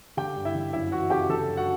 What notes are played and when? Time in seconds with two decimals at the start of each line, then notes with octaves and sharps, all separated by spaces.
0.17 D3 G4 G5
0.36 G2
0.45 E4 E5
0.55 D3
0.73 F#2 E4 E5
0.92 E3 F#4 F#5
1.10 C#3 G4 G5
1.29 D3 A4 A5
1.48 F#2
1.57 F#4 F#5